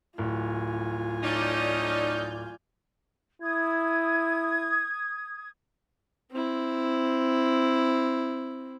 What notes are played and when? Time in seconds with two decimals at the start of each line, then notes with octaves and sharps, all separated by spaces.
0.18 D1 F4 G#5
1.23 A3 C#4 D#4 D5 F6 G6
3.42 E4 D#6 G#6
6.32 C4 E4